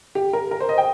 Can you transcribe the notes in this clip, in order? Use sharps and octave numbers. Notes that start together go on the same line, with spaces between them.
G4
A#4
A#4
C5
D#5
G5